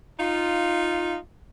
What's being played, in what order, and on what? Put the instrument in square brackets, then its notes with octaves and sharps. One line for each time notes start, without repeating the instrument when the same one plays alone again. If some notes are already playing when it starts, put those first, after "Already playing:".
[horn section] D#4 F4